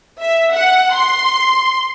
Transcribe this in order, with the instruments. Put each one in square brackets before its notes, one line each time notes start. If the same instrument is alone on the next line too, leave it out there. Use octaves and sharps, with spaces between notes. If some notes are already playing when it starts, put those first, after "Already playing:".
[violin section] E5
F#5
C6